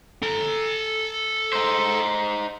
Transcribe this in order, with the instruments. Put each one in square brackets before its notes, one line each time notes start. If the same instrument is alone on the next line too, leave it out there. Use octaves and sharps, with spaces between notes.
[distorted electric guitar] A4 A#5
[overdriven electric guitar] D#4 C5